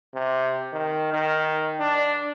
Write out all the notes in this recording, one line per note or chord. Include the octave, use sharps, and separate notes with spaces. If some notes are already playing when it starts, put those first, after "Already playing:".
C3
D#3
D#3
D4